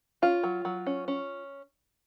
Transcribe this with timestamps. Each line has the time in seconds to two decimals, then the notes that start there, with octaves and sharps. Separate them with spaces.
0.22 C#4 F4
0.43 F#3
0.65 F#3
0.86 C#4
1.08 C#4